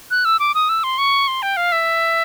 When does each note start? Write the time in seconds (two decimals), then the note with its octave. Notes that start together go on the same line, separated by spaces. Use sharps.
0.11 F#6
0.25 E6
0.40 D6
0.55 D#6
0.69 E6
0.84 C6
0.98 C#6
1.28 C6
1.42 G5
1.57 F5
1.72 E5